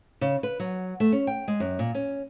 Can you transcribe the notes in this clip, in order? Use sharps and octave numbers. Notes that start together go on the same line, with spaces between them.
C#3
B4
F#3
A3
C#4
G5
G#3
F#2
A#2
C#4